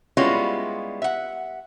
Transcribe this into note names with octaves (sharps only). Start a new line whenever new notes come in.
G3 G#3 B3 C#4 E4 F4
E5 F#5